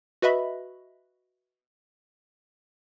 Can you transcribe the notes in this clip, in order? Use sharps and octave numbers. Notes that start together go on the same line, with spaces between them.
F#4 B4 D#5 E5 B5